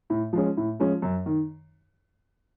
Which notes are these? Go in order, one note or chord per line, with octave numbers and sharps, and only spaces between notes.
A2
F3 G#3 C#4
A2
F3 G#3 C#4
F#2
D#3